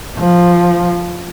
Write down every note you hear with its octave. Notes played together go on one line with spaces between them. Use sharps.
F3